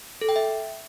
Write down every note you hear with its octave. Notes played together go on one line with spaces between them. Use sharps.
A4
G5
E5